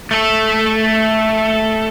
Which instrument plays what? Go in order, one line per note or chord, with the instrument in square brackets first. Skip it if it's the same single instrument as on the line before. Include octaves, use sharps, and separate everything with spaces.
[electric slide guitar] A3 A4